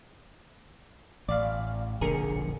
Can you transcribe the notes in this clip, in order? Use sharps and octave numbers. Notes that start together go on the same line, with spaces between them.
A1 D5 F5
E1 A#1 D3 G#4 A#4 C#7